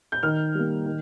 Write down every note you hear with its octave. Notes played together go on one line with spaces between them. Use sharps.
G6
D#3 F6
G3 A#3
D#3